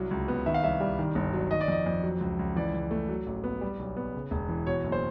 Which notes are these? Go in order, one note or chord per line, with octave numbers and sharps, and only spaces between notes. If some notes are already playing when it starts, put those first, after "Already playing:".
Already playing: C2 F#3
C#2
B3
D#3 E5
F5
C2 E5
G3
D#3
G1
F#3
D#3 D#5
D5
F2 D#5
F2
F#3
C#2
C#2
E3 D5
C#2
A3
F#3
A1
B3
G3
B1
B3
C#3
E1
E3
B2 C#5
F#1
C5